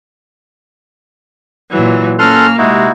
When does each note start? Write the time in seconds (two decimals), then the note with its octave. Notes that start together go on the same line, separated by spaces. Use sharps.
1.71 A#2 E3 F#3
2.19 A#3 C#4 A4 C6 F6 F#6
2.58 C3 G#3 D#4 E4 F#4